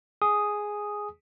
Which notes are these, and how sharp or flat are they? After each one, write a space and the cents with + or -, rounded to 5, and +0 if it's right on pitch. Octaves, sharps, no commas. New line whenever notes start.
G#4 +0 D#6 +0